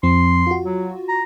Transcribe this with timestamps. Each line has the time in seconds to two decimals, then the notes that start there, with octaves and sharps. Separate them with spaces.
0.03 F2 F3 C4 C6
0.47 F4 F#4
0.65 F#3
1.08 A#5